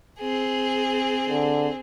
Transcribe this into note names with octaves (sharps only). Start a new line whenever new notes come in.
C4 G#4
D3